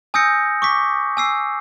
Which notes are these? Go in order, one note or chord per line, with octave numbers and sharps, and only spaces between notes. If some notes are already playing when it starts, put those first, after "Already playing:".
G#5 D#6 E6 G6 A#6 C#7
C#6 D6 B6
G#5 E6 C7